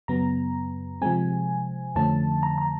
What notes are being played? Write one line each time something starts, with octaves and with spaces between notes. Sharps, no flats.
F#2 C#3 F#3 B3 A#5
C3 F3 G#3 C4 G#5
F2 D3 F3 A3 C#4 A5
A#5
A#5